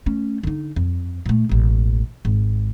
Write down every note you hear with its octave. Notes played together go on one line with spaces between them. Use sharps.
A3 C#4
D3 D#4
F2
A#2 A3
E1 A1
G#1 G#2